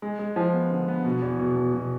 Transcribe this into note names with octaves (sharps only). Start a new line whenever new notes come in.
G#3
G#3
F3
B3
D3
B3
B2
E2
B2
B2
B2